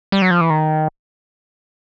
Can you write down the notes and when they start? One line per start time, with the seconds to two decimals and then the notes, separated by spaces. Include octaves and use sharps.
0.12 G3
0.22 F#3
0.31 F3
0.41 E3
0.50 D#3